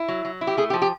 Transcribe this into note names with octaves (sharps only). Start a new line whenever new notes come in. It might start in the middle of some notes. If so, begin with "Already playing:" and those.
Already playing: E4
F#3
F#3
E4
G4
A3 G#4
G4
F3
G4